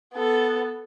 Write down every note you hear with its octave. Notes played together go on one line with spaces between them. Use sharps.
B3 A4